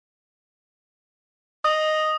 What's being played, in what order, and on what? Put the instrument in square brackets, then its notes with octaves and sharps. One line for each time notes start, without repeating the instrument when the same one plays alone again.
[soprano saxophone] D#5 [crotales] D#6